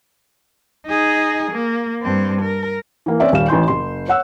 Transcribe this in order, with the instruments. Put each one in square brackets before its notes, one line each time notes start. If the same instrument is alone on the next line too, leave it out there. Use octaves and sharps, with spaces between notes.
[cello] D#4 G#4
A#3
G2 C4
A#4
[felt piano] E3 A#3
C4 C#4 D5 E5
D#1 G3 F5 E7
A1 E3 C6 G6
F#1 C6
C#5 F#5 E6 F#6